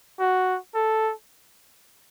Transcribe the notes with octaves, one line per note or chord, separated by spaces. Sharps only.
F#4
A4